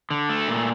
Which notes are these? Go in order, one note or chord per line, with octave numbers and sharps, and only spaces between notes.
D3
A3
A#2